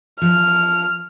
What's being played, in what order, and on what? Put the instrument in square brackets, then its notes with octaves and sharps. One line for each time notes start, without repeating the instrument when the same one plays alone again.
[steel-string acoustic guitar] F3 [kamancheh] F6